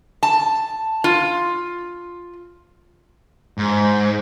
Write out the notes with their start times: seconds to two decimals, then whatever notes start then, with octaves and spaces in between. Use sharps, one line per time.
0.23 A5
1.04 F4
3.58 G#2